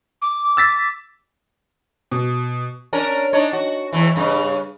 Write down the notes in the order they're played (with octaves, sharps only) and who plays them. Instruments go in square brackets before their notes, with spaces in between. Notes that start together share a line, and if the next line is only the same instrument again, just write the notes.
[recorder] D6
[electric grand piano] E6 A6 B6
[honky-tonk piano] B2
[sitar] C#4 D4 A#4
D4 D#4 C#5
F#4
E2 E3
G2 C#3